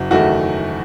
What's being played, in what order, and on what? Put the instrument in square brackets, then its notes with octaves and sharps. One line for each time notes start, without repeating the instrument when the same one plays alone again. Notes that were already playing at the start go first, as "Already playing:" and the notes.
Already playing: [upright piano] F#1 [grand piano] F#4
[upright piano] E2 D#3 A3 [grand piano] F#4